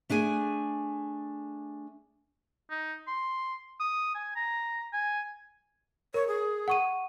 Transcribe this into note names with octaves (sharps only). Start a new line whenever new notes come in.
A3 D4 G#4 G#5
D#4
C6
D#6
G#5
A#5
G#5
A#4 C#5
G#4
F#5 C#6 D#7